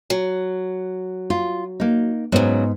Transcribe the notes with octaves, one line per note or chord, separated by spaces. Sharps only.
F#3
F4
A#3 D#4
G#2 C#3 F#3 B3